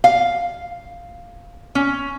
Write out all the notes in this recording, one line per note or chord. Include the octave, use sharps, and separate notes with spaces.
F5
C#4